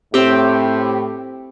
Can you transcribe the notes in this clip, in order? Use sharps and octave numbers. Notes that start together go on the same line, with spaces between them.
A2 C4 G4